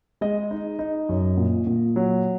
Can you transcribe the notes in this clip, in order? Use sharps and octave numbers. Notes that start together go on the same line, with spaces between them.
G#3 D#5
D#4
D#4
F#2
A#2
A#2
F#3